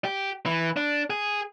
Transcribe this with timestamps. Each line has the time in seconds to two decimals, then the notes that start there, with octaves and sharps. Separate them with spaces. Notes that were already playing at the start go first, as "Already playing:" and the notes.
0.05 G4
0.46 E3
0.77 D4
1.10 G#4